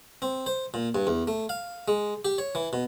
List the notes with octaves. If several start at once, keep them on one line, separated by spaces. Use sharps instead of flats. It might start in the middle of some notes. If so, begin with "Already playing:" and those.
C4
C5
A#2
G2
E2
A3
F5
G#3
G4
C#5
E3
B2